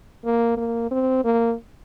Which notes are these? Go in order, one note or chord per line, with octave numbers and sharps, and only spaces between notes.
A#3
A#3
C4
A#3